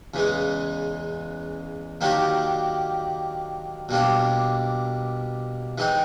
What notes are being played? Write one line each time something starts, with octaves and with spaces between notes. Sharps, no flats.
E2 C#3 E3 G#3
D#3 F#3 A#3 D4 G4
B2 G3 A#3 D4
E3 G#3 C4 D#4